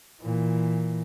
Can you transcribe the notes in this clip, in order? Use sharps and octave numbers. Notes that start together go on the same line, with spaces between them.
A#2 E3